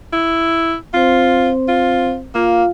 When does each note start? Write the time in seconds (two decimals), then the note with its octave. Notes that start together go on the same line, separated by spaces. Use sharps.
0.13 E4
0.94 C4 F4 C5
1.68 F4
2.35 A#3 F4 F5